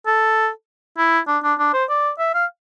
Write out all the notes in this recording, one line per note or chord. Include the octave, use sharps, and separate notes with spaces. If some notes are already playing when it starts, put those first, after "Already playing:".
A4
E4
D4
D4
D4
C5
D5
E5
F5